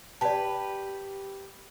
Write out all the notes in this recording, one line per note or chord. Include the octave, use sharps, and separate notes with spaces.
G4 B4 D5 A5